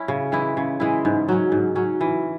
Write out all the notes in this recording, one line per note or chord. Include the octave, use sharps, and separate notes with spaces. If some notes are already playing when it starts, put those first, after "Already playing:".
Already playing: C#4 E4
C#3
E3 G#3 E4
C#3
E3 G#3 E4
G#2
F#3 C#4
G#2
F#3 C#4
E3